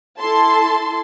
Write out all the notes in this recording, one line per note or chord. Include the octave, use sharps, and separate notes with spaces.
E4 A4 A5 C6